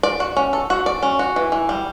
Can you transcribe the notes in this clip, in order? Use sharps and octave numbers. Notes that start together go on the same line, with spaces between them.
D5
F#4
C#4
A4
F#4
D5
C#4
F#4
E3
E3
G3